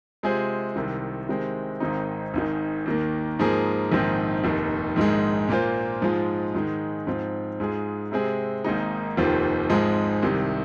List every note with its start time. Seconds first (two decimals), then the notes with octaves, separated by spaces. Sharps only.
0.23 C3 G#3 F4 G#4 C5
0.76 C2 C3 D#3
1.28 C3 D#3 G#3 C4
1.80 G#1 G#2 D#3 C4 D#4
2.34 G#1 G#2 D#3
2.86 D#2 D#3 A#3
3.39 G#2 F3 A#3 G#4
3.92 A#1 G#2 D#3 C4
4.44 F1 D#2 D#3
4.96 A#1 G#2 D#3 G#3
5.49 A#2 A#3 F4 C5
6.02 G#2 F3 G#3 F4
6.54 G#2 D#3 G#3
7.07 G#2 F3 C4 F4
7.60 G#2 G#3 F4 G#4
8.11 C3 G#3 C4 G#4
8.64 G#1 G#2 D#3 A#3 D#4
9.17 F1 D#2 D#3 C4 F4
9.70 G#1 G#2 F3 G#3
10.22 C2 C3 D#3